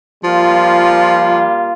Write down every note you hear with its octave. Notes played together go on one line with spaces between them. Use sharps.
F3 G3 A#3 F4